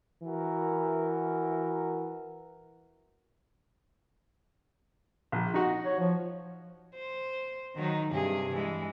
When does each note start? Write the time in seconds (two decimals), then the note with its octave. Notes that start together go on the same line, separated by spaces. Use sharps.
0.24 E3 F#4 A#4
5.32 A#1
5.54 D#4 F#4
5.86 C#5
6.00 F3
6.95 C5
7.76 D#3 F#3 D#4
8.11 G2 C3 G#4
8.53 E3 G#3